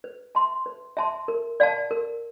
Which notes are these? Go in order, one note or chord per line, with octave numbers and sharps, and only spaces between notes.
B4
E5 A5 C6
B4
E5 A5 C6
A#4
D5 F5 A5
A#4